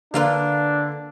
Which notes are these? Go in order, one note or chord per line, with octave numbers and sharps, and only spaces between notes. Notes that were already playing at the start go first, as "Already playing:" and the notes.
D3 A#3 D4 F4 B4